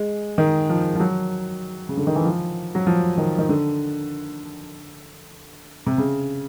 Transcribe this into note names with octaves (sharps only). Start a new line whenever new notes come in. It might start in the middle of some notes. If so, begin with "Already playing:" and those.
Already playing: G#3
D#3
F3
F3
F#3
C#3
D3
D#3
E3
F3
F#3
F3
D#3
D#3
D3
C3
C#3